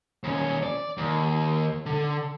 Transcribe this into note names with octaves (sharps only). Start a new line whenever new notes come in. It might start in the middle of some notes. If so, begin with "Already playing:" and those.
D#2 C#4
D5
D#2
D3